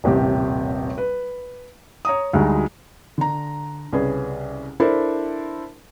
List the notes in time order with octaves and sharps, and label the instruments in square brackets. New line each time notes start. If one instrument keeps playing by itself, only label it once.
[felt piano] D#1 A1 C3 G4
B4
C#5 A#5 D#6
D2 G3 G#3 D#4 F#4
D3 A#5
C2 C#3 C#4 G#4 B4
D4 E4 A4 A#4 C5 E5